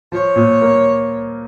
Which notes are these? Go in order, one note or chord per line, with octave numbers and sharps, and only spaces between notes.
F3 C#5
A#2
A#3